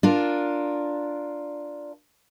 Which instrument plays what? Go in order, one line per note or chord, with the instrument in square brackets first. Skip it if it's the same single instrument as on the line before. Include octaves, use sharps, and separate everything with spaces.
[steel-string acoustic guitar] D4 F4 A#4